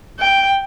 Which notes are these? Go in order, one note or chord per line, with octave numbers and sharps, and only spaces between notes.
G5